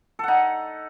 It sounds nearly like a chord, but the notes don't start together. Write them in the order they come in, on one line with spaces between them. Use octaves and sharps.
A4 F#5 D#4